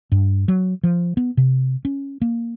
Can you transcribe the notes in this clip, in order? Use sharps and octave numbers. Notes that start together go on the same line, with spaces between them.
G2
F#3
F3
B3
C3
C#4
A#3